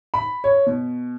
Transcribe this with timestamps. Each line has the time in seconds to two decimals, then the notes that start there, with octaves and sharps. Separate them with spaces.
0.14 B5
0.44 C#5
0.67 B2